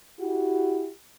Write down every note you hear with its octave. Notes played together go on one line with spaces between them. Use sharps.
E4 F#4 G4